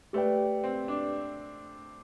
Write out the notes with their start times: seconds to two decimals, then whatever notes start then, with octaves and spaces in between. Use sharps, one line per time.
0.13 A3 G4 B4 D5 G5
0.64 C4
0.88 D4